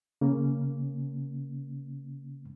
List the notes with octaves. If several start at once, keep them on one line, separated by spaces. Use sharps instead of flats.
C#3 A#3 C#4